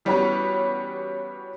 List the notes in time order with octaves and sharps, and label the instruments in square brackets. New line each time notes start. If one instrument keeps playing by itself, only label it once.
[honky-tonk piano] E3 G3 B3 C#4 F#4 B4